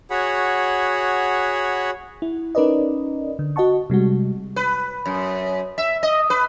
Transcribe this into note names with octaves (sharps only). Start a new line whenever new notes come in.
F#4 G#4 C#5 F#5 B5
E4
C#4 D#4 A#4 B4 D5 D#5
D3
F#4 D#5 F#5 A5 C#6
C3 G3 G#3 F#4
B4
F#2
E5
D#5
B4